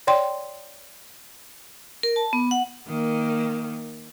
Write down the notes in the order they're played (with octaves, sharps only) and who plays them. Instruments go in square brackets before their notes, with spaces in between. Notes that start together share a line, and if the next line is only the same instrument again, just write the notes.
[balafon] C#5 D5 G5 C6
[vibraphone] A#4
A5
B3
F#5
[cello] D#3 A#3